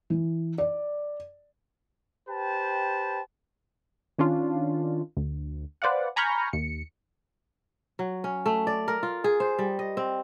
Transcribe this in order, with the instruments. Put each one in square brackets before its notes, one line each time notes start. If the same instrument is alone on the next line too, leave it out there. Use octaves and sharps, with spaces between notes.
[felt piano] E3
D5
[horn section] G4 B4 C5 G5 A5
[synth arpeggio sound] D#3 C#4 D4 F4
D2
B4 C5 D5 F5 F#5
G#5 A#5 B5 C#6 F6 G6
D#2 C#7
[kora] F#3
C#4
A3
D5
A#4
F4
G#4
C5
G3
D#5
C4